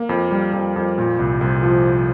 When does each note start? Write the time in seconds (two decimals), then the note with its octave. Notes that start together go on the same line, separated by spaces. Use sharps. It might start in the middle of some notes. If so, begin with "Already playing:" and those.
Already playing: A#3
0.09 F2
0.31 G3
0.53 F2
0.76 F2
0.98 A#2
1.19 C2
1.41 C2
1.63 F3